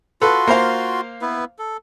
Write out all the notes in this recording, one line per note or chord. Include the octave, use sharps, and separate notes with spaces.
F4 F#4 A4 B4 C6
A#3 C5 F5
B3 E4 B4
A4